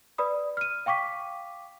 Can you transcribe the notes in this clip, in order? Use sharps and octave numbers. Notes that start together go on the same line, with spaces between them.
B4 D5 B5 D#6
F6 D#7
F5 G5 C#6 D6 B6